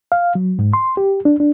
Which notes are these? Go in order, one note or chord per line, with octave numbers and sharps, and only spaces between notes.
F5
F#3
G#2
C6
G4
D4
D4